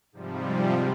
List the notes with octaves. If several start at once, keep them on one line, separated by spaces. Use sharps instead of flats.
G#2 C3 F3 G3